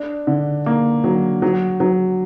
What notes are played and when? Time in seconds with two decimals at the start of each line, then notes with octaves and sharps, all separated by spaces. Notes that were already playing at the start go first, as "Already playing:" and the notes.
Already playing: D4
0.27 D3
0.66 A#3
1.04 F#3
1.42 F#3
1.80 F#3